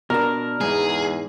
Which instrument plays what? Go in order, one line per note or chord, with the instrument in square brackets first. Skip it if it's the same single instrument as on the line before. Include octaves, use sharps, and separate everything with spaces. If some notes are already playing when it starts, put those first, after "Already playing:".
[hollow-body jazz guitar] B2 D4 [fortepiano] A#4
[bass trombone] E2 [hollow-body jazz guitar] G#2 [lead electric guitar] G#4